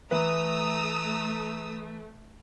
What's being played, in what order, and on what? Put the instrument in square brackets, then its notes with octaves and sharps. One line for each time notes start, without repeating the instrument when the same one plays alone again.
[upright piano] E3 B4 [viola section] A3 [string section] A#5 D#6 E6